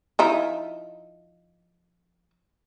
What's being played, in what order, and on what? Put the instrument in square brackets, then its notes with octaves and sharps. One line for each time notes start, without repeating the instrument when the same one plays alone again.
[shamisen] F3 D#4 E4